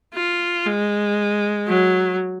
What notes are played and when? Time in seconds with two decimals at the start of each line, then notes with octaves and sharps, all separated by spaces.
0.14 F4
0.66 G#3
1.68 F#3